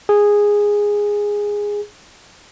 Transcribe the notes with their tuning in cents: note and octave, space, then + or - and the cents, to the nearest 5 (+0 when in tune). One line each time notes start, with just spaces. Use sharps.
G#4 -10